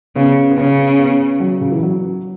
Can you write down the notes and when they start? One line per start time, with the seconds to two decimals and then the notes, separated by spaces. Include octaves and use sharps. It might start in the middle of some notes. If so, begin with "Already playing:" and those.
0.16 C#3 B3
0.51 B3
0.57 C#3 C#4
0.99 B3
1.40 F#3
1.61 C#3
1.72 E3
1.83 F#3